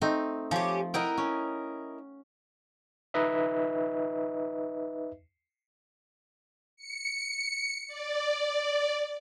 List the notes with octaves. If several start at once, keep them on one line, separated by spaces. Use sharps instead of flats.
A3 C4 D#4
F3 C#4 G4
E4 A#4 D#5 F#5 G5
C#4
D#4 B4 D#5 E5
C#7
D5